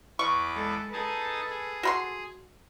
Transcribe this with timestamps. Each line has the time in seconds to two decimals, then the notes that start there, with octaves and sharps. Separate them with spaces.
0.19 E2 B4 C#6 D6
0.55 G#3 A4
0.93 D#4 G#4 A4 B4 A5
1.50 G#4
1.83 F#4 B5 C6